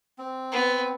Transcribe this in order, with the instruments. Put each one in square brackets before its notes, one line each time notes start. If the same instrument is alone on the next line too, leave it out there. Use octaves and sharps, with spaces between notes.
[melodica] C4
[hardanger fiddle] B3